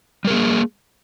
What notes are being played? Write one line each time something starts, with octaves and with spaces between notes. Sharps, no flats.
G3 A#3 G#4 A#4